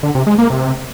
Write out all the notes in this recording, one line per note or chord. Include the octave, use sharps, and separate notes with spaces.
D3
C3
G#3
A#3
C3